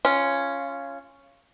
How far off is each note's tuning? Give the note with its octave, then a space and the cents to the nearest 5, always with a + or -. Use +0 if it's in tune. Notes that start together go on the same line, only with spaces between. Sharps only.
C#4 +0 F4 -15